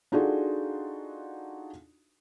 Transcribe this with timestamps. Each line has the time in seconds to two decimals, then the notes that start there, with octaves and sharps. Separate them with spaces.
0.12 D4 D#4 F4 F#4 G#4 A4